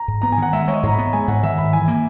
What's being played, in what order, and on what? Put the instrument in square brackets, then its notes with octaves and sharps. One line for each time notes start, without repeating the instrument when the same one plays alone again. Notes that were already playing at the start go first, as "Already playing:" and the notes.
Already playing: [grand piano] A#5
[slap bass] G#2
[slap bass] B3 [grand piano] A#5
[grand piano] G#5
[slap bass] D#3 [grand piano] F#5
[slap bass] G#3 [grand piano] E5
[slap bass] G#3 [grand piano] C#5
[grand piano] D#5
[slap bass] G#2 [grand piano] A#5
[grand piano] B5
[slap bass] B3
[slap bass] G#3 [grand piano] G#5
[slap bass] G#2 [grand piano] F#5
[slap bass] D#3 [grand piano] E5
[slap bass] G#2 [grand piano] B5
[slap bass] E3 [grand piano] G#5
[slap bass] A#3